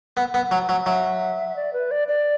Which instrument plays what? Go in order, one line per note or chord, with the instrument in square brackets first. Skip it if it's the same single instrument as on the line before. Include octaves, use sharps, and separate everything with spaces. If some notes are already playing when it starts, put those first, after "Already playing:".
[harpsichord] B3
B3
F#3
F#3
[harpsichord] F#3 [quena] E5
[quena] D5
B4
D5
D5